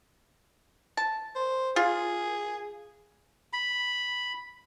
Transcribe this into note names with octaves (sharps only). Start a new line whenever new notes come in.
A5
C5
F4 G#4
B5